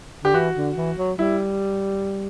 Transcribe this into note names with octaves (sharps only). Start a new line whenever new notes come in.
D3 G4
E3 F#4
D3
E3
F#3
G3 E4